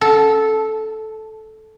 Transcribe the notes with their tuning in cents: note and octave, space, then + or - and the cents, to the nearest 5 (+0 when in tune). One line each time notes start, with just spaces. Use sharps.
A4 -10